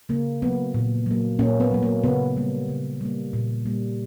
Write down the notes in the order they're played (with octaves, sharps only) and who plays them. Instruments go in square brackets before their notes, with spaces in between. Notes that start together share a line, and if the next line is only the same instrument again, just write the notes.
[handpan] C#3 A#3
F#3 A#3 B3
A#2
F#3 A#3
A#2 A#3 C#4
B3
F#3 A#3
A#3
C#3 B3
G3 A#3
C#3
G3 A#3
A#2
G3 A#3